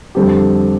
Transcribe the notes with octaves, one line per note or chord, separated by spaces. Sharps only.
F2 D3 G3 C4 G4